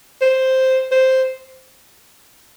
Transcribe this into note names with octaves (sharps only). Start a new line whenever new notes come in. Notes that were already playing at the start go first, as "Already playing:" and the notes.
C5
C5